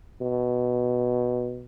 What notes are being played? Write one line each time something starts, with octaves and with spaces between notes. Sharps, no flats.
B2